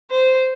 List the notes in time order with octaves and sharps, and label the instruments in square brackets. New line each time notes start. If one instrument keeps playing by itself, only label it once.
[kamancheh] C5